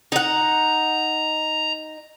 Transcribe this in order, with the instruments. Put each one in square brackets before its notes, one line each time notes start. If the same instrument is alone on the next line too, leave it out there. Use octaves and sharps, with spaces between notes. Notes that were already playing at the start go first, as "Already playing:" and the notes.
[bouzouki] D#4 F#5 [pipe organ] A#5